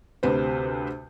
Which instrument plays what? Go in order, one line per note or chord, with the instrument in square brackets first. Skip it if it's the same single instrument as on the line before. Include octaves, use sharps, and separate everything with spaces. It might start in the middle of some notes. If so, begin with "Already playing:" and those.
[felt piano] D2 C3 B4 C5